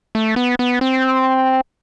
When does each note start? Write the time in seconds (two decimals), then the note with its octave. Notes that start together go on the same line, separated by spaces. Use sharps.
0.15 A3
0.36 B3
0.59 B3
0.81 C4